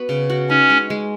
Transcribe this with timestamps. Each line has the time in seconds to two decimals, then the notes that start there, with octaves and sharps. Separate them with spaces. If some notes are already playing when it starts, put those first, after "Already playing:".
Already playing: B3 F#4 B4
0.09 C#3
0.30 F#4
0.49 C#4 D#4
0.70 G#3
0.90 G#3